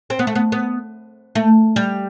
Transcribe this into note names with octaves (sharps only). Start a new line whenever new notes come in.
C4
B3
A3
B3
B3
A3
G3